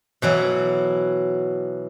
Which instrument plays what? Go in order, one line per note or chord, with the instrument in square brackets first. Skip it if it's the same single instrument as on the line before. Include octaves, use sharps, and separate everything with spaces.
[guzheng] B2 E3 F#3